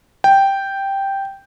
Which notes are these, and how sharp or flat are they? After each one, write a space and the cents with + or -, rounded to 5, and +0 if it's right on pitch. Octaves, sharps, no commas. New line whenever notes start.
G5 +0